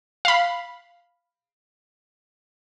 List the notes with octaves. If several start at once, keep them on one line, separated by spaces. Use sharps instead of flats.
F5 B5